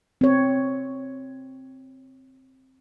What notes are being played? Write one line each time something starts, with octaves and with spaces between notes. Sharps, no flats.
C4 C#5